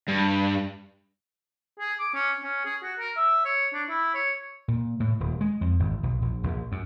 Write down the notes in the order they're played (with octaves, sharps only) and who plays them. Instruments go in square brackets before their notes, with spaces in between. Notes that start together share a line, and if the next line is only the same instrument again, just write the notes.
[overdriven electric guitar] G2
[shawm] G#4
D6
C#4
C#4
G#4
F#4
A#4
E5
C#5
D4
E4
C#5
[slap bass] A#2
A2
D#1
G#3
F2
G#1
B1
A#1
A#1
F#2